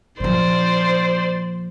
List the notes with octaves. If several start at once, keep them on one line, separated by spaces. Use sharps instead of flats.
A#2 F3 C5 D5